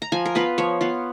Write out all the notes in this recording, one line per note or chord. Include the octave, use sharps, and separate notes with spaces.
A#5
F3 G#5
A#4
B3 F4 B4
F3 C#5
B3 F4